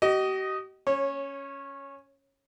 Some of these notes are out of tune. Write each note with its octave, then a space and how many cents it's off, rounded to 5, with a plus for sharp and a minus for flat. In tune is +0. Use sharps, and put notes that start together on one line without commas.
G4 -45 D#5 +0 D#6 +0
C#4 +0 C#5 -20